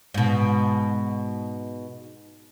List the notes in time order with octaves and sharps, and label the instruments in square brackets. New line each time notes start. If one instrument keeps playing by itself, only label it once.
[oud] G#2 B2